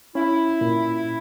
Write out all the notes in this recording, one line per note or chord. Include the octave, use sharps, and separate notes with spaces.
C#4 E4
A#2